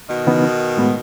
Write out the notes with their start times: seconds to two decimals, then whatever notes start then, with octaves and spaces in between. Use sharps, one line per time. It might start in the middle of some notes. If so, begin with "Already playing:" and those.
0.09 B2 D#3
0.27 C#3 E3 B3 D#4
0.77 A2 G#3 B3 F#4